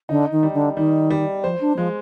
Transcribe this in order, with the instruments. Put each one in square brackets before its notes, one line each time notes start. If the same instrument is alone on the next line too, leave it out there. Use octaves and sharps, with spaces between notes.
[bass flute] D3 [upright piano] D#4
[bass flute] D#3
[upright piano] G3
[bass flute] D3
[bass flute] D#3 [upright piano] G3
[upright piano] G3
[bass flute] F3 [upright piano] C5
[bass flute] D4
[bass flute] F3 [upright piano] G#3